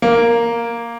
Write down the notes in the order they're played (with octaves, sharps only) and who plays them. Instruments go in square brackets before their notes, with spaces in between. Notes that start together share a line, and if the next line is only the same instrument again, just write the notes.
[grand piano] A#3